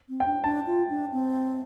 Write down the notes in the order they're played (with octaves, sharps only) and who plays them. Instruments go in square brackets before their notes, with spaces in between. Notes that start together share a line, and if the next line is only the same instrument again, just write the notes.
[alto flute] C4
[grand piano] G5
[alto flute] D4
[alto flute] D4 [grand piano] A5
[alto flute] F4
D4
C4